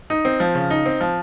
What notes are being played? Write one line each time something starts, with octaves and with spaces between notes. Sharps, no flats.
D#4
C4
F3
C#3
D#4
C4
F3